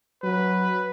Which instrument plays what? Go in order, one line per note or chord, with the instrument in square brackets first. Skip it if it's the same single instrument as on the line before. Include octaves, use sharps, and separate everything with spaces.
[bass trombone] F#3 [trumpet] B4